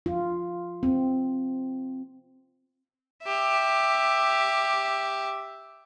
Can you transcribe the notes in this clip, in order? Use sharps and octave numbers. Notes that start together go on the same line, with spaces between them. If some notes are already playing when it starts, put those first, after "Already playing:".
F4
C4
G4 E5